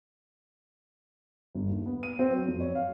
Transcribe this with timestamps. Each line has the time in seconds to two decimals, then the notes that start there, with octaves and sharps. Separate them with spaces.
1.55 G1
1.69 D#2
1.86 B3
2.03 D#7
2.19 C4
2.31 F#3
2.48 F2
2.60 C#5
2.75 F5